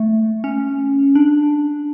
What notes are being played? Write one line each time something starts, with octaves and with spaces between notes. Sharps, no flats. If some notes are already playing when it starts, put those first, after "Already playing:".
Already playing: A3
C#4
D4